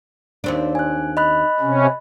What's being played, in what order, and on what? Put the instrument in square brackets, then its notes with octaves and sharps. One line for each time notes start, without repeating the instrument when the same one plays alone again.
[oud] D#2 C4 D4
[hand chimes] G#5 F#6
D#5 B5 F#6
[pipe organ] C3 C#4